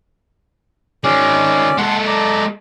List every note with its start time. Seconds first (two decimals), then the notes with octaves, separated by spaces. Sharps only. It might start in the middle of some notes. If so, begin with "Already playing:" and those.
1.04 D#3 G#3 C#4 D5
1.78 G#3 A4 F#5 C6
2.07 D5 A#5